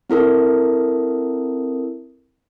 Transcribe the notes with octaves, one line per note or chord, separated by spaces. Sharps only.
C4 E4 A4 A#4